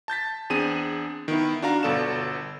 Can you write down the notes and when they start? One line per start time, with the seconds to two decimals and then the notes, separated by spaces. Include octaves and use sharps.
0.08 A5 G6 A6 B6
0.50 E2 C4 D4 G#4 D#7
1.28 D#3 B3 E4
1.62 D4 F#4 F5 A#5
1.83 G1 B2 A4 D5 E7